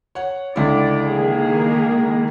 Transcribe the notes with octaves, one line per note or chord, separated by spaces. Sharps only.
C#5 F#5
C#2 D3 E4 D5
D#3 A#3 G#4